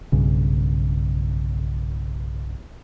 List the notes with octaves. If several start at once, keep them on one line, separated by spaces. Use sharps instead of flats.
B1 G2 C#3